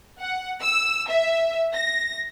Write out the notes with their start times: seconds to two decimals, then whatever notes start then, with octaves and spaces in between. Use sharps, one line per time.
0.20 F#5
0.61 E6
1.09 E5
1.74 A#6